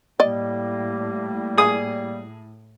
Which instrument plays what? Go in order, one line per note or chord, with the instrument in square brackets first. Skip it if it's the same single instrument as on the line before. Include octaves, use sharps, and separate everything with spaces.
[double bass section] A2 [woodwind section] G3 A#3 [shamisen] D5 D#5
[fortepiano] G#4 D#6